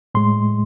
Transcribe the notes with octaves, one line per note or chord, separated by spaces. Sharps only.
A2 G#3 C6